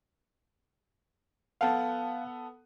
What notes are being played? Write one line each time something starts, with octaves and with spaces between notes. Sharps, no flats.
B3 A4 F5 F#5 A5